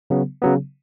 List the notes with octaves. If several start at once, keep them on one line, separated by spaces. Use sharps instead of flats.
C#3 F#3 B3
C#3 F#3 B3